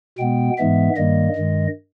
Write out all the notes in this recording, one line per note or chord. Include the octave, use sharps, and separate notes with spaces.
B2 G#3 B3 G5
G#2 E3 G#3 B3 E5
G2 D#3 G3 A#3 D#5
G2 D#3 G#3